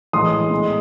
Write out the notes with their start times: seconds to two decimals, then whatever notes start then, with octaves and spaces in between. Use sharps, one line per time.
0.13 A2 E3 G#3 C6 D#6
0.50 A2 G#3